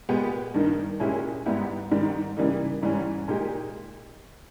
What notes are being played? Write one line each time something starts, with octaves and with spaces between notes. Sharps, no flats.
A#2 G#3 B3 G4
G2 D#3 A#3 D#4
A#2 G#3 C#4 E4 G4
G#2 G3 B3 E4 G4
G#2 D#3 G3
C#3 E3 G3 A#3 D#4
G#2 E3 G3 C#4
A#2 G#3 D#4 G4